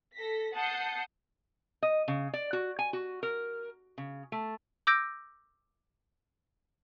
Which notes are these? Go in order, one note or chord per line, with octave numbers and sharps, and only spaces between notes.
A4 A#6 B6
F#5 A5 D#6 G6 C7 C#7
D#5
C#3
D5
F#4
G#5
F#4
A#4
C#3
A3
D6 E6 G6 A#6 D7